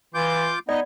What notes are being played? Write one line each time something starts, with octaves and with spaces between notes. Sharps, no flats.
E3 F4 D6 G6
B3 D#4 D5 D#5